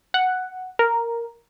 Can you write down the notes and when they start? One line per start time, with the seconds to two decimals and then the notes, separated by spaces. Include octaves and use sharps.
0.14 F#5
0.79 A#4